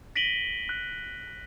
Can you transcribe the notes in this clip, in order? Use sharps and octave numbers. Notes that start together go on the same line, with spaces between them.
A#6 B6 D7 D#7 F#7 G7
F#6